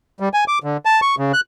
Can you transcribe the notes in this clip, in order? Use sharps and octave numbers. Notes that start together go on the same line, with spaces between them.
G3
G#5
D6
D3
A5
C#6
C#3
F#6